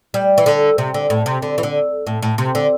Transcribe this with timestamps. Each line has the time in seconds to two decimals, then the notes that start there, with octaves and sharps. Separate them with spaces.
0.14 G3
0.38 E3
0.46 D3
0.78 C3
0.94 D3
1.10 A2
1.26 C3
1.42 D3
1.58 E3
1.63 D3
2.07 A2
2.23 A2
2.38 C3
2.55 D3